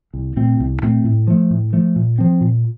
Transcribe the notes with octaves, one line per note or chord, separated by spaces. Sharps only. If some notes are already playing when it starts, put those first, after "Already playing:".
C2
A#2 A3 C4
C2
A#2 A3 C4
A2
F3 A3
A2
F3 A3
A#2
F3 C4
A#2